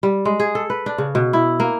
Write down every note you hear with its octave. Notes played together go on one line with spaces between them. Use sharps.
G3
G#3
G#4
A4
B4
D4
C#3
B2
E4
A#3